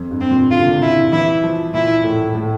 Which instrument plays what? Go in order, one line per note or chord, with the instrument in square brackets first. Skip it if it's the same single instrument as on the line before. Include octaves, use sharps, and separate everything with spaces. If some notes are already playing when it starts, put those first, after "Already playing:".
Already playing: [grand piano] F2
G2
[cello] C4
[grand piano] A#2
[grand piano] D3 [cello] F4
[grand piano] C3
A#2
C3
[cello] E4
[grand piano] E3 [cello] E4
[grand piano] F3
[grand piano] A#2 [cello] E4
[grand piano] A2
A2